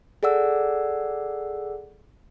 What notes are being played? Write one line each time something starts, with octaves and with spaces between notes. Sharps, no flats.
G#4 A4 D5 F#5 E6